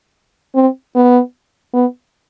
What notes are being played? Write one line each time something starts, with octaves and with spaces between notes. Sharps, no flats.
C4
B3
B3